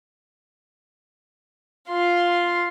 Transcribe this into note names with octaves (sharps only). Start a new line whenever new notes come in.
F4 C6